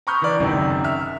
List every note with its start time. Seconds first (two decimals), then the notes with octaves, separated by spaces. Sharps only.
0.07 A#5 B5 C#6 D#6 F6 G6
0.22 E3 D5
0.39 F#1 F#2 C3 D#3
0.84 E5 F6